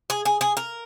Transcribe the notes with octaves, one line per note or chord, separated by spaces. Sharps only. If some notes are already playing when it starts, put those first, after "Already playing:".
G#4
G#4
G#4
A#4